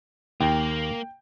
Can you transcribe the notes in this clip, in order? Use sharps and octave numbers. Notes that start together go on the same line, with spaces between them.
D#2 A#3 G5